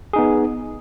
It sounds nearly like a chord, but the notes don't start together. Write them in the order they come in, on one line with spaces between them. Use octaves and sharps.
G#4 D#4 B3